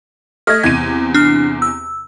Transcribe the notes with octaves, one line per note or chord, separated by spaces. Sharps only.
A3 D#5 F6 G#6
E2 C3 G#6 D#7
D4 F6
E6